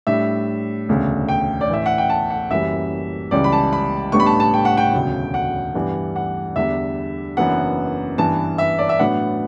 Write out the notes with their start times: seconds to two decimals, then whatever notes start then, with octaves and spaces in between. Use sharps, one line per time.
0.07 A2 G3 D4 E5
0.88 E1 D2 C#3
1.29 G5
1.61 D5
1.69 A1 A2 E3 E5
1.86 F#5
1.98 G5
2.10 A5
2.30 F#5
2.50 F#1 F#2 E3 G3 E5
3.31 C#2 C#3 E3 G3 D5
3.44 B5
3.52 A5
3.73 B5
4.12 A1 A2 G3 B3 D4 C#6
4.20 B5
4.26 A5
4.40 A5
4.54 G5
4.65 F#5
4.77 G5
4.93 E1 D2 C#3 F#3
5.34 F#5
5.74 G2 E3 G3 B3 D4
6.16 F#5
6.56 E2 D3 G3 D4 E5
7.37 F#1 F#2 E3 B3 D4 F#5
8.18 G2 E3 B3 A5
8.58 E5
8.78 D5
8.89 E5
8.99 A2 F#3 B3 D4 F#5